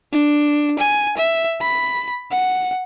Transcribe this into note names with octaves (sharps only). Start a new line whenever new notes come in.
D4
G#5
E5
B5
F#5